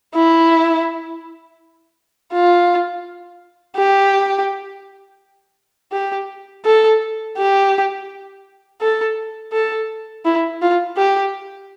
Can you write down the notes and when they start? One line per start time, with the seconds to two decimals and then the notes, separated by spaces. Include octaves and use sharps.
0.15 E4
2.33 F4
3.76 G4
5.92 G4
6.65 A4
7.38 G4
8.81 A4
9.53 A4
10.26 E4
10.62 F4
10.97 G4